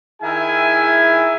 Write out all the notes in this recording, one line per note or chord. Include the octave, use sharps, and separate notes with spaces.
D#3 E4 G#4 E5 G#5